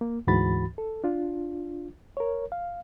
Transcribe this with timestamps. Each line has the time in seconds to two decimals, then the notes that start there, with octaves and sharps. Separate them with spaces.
0.01 A#3
0.27 D2 G#2 E3 F#4 B5 A6
0.78 A4
1.04 D4 F4
2.17 A#4 C#5
2.52 F5